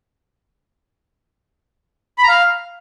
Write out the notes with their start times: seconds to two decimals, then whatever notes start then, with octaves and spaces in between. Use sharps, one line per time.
2.18 B5
2.23 A#5
2.28 F5